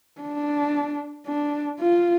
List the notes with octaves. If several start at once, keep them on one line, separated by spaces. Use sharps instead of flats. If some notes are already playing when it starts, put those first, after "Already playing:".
D4
D4
F4